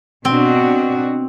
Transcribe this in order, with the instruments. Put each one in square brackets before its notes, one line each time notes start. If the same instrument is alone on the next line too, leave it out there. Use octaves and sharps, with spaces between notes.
[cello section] B2 D4 F#4 [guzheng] C4